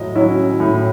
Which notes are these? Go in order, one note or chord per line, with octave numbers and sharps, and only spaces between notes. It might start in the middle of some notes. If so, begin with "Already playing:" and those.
Already playing: A2 F#3 D#5
F#3 C#4 E4
A2